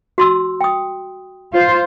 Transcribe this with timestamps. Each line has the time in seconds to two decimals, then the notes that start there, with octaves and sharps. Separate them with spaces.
0.18 F#4 C6 E6
0.61 G5 D#6
1.53 F4 C5